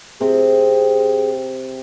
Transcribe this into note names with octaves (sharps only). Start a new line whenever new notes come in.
C3 C4 G#4